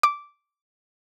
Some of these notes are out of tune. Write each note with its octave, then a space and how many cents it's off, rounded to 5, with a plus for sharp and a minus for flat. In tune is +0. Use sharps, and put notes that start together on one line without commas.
D6 -10